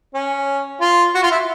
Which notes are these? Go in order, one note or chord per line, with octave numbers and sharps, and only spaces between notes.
C#4
F4
F#4
F4
E4